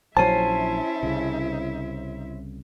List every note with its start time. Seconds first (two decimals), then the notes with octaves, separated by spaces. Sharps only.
0.17 A#1 F#3 C#4 E4 C5 E5 G#5 A5
1.03 C2 C#3